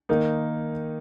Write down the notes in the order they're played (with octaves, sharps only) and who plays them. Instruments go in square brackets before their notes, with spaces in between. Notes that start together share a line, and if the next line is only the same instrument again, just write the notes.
[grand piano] D#3 A#3 D#4